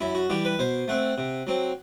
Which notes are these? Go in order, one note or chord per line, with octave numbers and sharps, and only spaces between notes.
F#2 E4
F#4
E3 G3 G4
B4
B2 C5
A3 C4 F#5
C3
F#3 C4